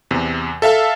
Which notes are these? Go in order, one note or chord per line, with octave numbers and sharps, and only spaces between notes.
E2 C3
A4 E5 F5 A5